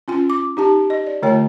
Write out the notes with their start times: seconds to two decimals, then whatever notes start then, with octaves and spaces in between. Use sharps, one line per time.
0.08 C#4 F4 G#5
0.30 D6
0.57 D#4 G4 A5
0.90 D#5
1.07 D5
1.22 D3 A3 F4 C#5 G5 A5